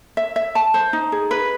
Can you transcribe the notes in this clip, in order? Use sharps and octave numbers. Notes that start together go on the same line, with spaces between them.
E5
E5
A5
C5
D#4
G#4
B4